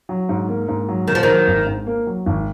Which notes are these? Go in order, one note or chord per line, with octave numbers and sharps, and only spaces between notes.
F#3
G#2
A#3
G#2
F#3
D#3 A#3
F3
D#3 F#3
G#1
G#2
A#3
F#3
G#1